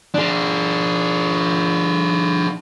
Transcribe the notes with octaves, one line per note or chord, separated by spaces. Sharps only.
D4 G#4